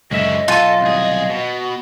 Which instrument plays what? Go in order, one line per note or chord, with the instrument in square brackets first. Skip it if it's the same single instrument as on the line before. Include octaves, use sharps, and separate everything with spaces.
[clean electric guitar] C#2 F#2 E5 [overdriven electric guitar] D3 C#4 [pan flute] D#5
[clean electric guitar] B1 G#5 [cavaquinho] F4 [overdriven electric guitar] A4
[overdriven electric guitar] C2 G#4
B2